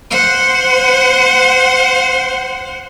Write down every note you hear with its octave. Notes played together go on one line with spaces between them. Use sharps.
C5 F#5